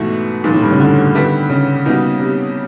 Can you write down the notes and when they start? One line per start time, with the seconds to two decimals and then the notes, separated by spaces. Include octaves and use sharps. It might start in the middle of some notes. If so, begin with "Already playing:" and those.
Already playing: G#2 B2 E3 A3
0.44 A#2 D#3 F3 G#3
0.53 A2
0.62 G2
0.71 C#3
0.80 D3
1.15 G2 D#3 G3 B3 E4
1.49 C#3
1.85 B2 G3 A#3 D#4 F#4
2.20 C3